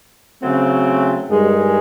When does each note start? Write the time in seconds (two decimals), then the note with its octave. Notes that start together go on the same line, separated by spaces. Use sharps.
0.41 C#3 F#3 A3 C4
1.29 G2 D#3 G#3